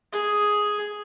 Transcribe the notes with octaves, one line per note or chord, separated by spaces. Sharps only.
G#4